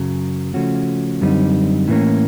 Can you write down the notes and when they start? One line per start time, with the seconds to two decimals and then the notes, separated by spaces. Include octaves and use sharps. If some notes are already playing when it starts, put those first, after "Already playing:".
Already playing: F#2 C#3 F#3
0.54 C#3 F3 A3 C#4 F#4
1.21 F#2 D3 G3 C4 D#4
1.88 A2 E3 G3 A#3 C#4